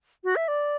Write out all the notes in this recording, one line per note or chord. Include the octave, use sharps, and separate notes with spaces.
F#4
E5
D5